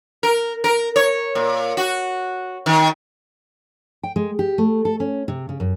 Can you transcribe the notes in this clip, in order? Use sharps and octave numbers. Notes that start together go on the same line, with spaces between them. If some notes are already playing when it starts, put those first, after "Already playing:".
A#4
A#4
C#5
A#2
F#4
D#3
G5
G#3
G4
A3
A4
C#4
C3
C#3
F#2